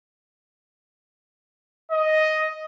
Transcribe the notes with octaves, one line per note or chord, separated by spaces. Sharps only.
D#5